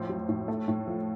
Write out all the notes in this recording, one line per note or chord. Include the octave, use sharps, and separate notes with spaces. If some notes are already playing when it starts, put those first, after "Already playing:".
Already playing: F2 A2 C5
F#3
A2
A3
A2
F3